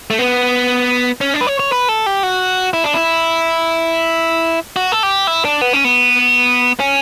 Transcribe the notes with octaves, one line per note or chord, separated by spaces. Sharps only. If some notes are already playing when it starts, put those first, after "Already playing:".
A3
B3
C#4
D4
B4
C#5
C#5
B4
A4
G4
F#4
E4
D4
E4
F#4
A4
G4
E4
D4
B3
C#4
B3
C#4